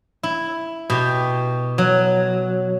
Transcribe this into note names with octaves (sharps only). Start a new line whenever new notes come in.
E4
B2 G4
F#3